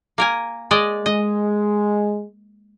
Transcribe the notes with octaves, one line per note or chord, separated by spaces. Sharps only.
A#3 A#4 G#5
G#3 D5 D#5
G#3 D#5